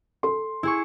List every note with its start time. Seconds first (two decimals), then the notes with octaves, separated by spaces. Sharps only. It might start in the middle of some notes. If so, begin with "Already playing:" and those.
0.23 A4 C6
0.63 E4 G#4 C#6